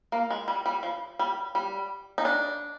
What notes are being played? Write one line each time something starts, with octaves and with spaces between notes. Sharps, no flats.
A#3
G#3
G3
G3
F3
G3
G3
D#4
D4